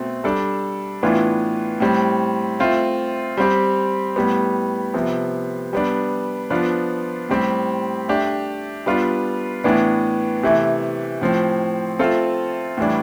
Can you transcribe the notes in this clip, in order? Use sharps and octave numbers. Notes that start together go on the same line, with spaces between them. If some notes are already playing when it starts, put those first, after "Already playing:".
Already playing: B2 A3 C4
G3 D4 A4
A2 E3 B3 D4 F4
A2 G3 C4
A3 C4 F4
G3 C4 G4
A2 G3 B3
C3 F3 B3
G3 B3 D4
F3 B3 D4 F4
A2 G3 C4 G4
A3 D4 G4
G3 B3 D4 F4
A2 E3 B3 D4
C3 E3 A3
A2 F3 C4
A3 C4 F4 A4
A2 E3 G3 D4